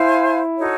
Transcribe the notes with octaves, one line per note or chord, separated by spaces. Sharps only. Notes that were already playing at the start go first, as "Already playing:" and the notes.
Already playing: E4 C5 F5 G#5
D#4 F#4 A4 C#5